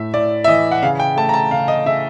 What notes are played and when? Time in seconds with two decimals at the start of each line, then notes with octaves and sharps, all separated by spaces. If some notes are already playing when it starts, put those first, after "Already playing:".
Already playing: A2 A3 E5
0.14 A2 D5
0.44 E5
0.48 E3 D#5
0.71 F#5
0.83 C#3 F5
1.00 G5
1.17 A3 A5
1.29 A#5
1.34 A5
1.51 C#3 F5
1.68 D#5
1.86 C#3 E5